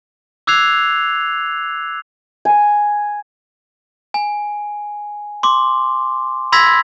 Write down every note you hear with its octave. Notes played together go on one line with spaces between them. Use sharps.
D6 E6 F#6 G#6 C7 F7
G#5
G#5
C6 D6
B5 C6 E6 G#6 A#6 B6